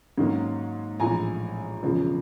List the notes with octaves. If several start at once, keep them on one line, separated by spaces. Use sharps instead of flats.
G#2 D#3 F#3 A#3 C#4
A#1 A2 E3 G#5 A#5
E1 E2 C#3 F3